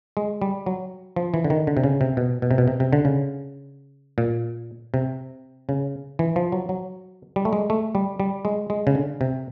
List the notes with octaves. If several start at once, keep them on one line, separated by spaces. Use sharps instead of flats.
G#3
G3
F#3
F3
E3
D3
D#3
D3
C3
C#3
C3
B2
B2
C3
B2
C3
C3
D3
C#3
A#2
C3
C#3
E3
F3
F#3
F#3
G3
A3
G#3
A3
G3
G3
G#3
G#3
C#3
D3
C3